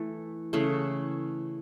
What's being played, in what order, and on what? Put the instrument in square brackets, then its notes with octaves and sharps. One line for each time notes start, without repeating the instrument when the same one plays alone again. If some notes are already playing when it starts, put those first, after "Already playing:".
Already playing: [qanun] E3 A3
C#3 E3 A3